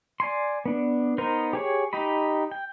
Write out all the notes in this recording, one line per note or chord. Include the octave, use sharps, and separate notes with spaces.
D5 G#5 C6
B3 D4
B3 D#4 A#4 C5
G4 G#4 C#5
D#4 G4 D#5 B5
G5